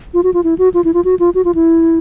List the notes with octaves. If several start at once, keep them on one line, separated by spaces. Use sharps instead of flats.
F4
F#4
F4
E4
F#4
F4
E4
F4
F#4
F4
F#4
F4
E4